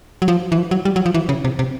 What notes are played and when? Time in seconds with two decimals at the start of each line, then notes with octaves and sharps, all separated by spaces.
0.22 F#3
0.28 F3
0.52 E3
0.58 F3
0.71 F#3
0.85 G3
0.96 F#3
1.06 F3
1.14 E3
1.29 C#3
1.44 C3
1.59 C3